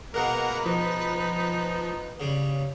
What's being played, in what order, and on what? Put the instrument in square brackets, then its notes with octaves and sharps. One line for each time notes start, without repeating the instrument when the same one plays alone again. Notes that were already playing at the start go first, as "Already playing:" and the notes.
[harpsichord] B2 G#3 [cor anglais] A#3 [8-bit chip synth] A#4 F#5 A#5 [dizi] B4
[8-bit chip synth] F3 [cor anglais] D#4
[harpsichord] C#3 G3